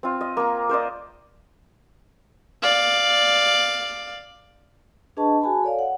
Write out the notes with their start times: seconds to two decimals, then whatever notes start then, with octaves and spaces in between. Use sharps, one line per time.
0.03 C4 F4
0.21 D#5
0.37 A#3 A#5
0.69 A#4 C5 D5 D#5
2.63 D5 F5
5.17 D4 G#4 B4 D#5 A5 C#6
5.42 F#4 G#4 G#5 A5 B5
5.63 A4 C#5 D5 F5
5.79 F#5